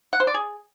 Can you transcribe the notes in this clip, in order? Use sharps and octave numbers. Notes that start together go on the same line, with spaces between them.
F#5
C5
D5
G#4